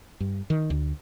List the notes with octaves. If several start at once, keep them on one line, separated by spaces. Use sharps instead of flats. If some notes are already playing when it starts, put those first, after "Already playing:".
G2
D#3
D2